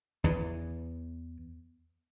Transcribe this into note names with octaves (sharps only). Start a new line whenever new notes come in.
E2 E3